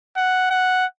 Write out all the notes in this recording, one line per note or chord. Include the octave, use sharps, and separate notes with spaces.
F#5
F#5